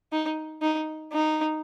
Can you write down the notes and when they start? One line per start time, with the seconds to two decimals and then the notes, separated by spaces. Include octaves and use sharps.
0.12 D#4
0.62 D#4
1.13 D#4